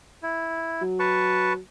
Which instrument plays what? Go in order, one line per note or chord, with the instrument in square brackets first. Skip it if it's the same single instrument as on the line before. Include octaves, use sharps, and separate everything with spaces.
[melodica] E4
[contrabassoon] F#3
[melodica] B4 A5 C#6